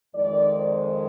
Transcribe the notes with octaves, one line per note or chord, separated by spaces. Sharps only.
F2 D#3 G#3 D5
C5